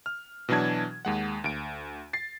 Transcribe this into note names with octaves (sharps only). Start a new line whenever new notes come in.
F6
B2 E3 F#3 D4 A5 G#6
D#2 G#3 F#5
D2 D7
A6 C7